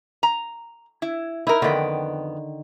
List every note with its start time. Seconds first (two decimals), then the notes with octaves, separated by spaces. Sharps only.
0.23 A#5
1.02 E4
1.47 D#4 E4 A#4
1.62 F2 D3 D#3 B3 G5